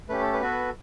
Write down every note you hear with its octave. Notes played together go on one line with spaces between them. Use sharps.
A3 C#4 G4 B4
A4
B4
B3 F#4 A4